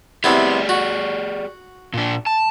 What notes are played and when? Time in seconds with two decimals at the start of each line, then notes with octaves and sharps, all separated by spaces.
0.24 C3 B3 E4 G4 G#4 D5
0.69 F#4
1.93 A#2 D4
2.26 A5